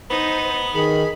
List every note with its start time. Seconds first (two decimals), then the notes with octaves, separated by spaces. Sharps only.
0.10 B3 D#4 C5
0.74 D#3 G#4 B5